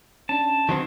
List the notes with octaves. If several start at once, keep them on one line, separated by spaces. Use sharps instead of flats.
C#4 D4 A5
D#3 F#3 C4